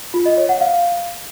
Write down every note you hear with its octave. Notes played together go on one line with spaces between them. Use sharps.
F4
D#5
C#5
F#5
F5